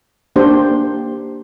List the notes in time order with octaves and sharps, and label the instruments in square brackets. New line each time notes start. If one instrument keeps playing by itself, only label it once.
[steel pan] A#3 D4 G4 C5